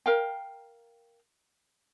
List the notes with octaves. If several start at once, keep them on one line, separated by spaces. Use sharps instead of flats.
A#4 F5 G5